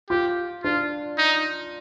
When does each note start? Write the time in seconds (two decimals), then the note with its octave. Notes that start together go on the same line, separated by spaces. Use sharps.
0.10 F4 G4
0.64 D4 F4
1.18 D#4